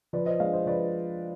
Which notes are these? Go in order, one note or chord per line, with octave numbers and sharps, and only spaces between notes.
F3 B4 D5
C5 D#5
G#3 D4 D5 F5
C5 D#5
F3 B4 D5